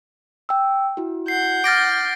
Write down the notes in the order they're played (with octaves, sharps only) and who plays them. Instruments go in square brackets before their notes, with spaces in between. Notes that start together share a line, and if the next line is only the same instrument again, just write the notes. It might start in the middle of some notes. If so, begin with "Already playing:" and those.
[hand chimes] G5 E6
E4 F#4
[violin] F#5 G6 [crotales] C7
[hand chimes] D6 F6 [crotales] A6 A#6 D7